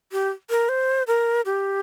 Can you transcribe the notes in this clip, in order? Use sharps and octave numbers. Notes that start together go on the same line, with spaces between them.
G4
A#4
C5
A#4
G4